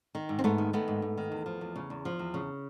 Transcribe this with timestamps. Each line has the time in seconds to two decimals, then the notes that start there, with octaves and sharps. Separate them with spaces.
0.15 D#3
0.29 G#2
0.39 C4
0.44 G#2 A3 B3
0.58 D#3
0.73 D#3 A3 B3
0.88 G#2
1.02 G#2
1.18 D#3
1.32 E2
1.46 F3
1.61 E2
1.76 C#3
1.90 E2
2.05 F3
2.19 E2
2.34 C#3